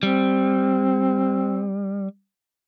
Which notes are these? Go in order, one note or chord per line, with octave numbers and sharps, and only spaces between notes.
G3 C4